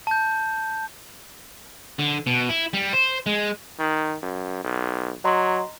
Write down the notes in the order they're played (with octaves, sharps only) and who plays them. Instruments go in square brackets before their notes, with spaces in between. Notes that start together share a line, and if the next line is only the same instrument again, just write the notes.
[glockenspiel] A5 G6
[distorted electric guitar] D3
B2
E4
G3
C5
G#3
[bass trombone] D#3
F#2
B1
[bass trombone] F#3 [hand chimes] D#5 A#5 C6